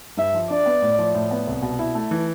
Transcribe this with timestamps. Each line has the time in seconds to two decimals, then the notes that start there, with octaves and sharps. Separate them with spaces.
0.17 G2 E5
0.34 F3
0.50 D4 D5
0.66 B3
0.82 A2
0.99 F3
1.14 A2
1.31 B3
1.47 C2
1.62 B2
1.79 E4
1.95 A3
2.11 E3